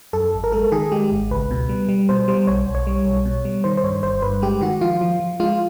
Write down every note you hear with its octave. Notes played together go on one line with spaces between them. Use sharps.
F#2 A4
G#1
A#4
G#3 A4
D#3 G#4
G#3 G4
G#1
C#2 B4
B2
G3
G3
B2 C5
G3 C5
B1 C#5
B1
C#5
G3
B1
B2
G3
D#3 C5
C5
G2 C#5
G1 C5
G2 B4
G#3 G4
D#3 F#4
F3 F4
F3
F3
G#3 F4